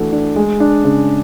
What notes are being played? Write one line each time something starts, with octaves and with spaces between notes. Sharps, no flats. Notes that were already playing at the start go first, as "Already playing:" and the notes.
Already playing: E3 A3 D4 F#4
D4
G#3
D4
C#3